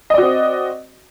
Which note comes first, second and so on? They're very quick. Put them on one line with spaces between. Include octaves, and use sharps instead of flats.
D#5 D5 F#4 C4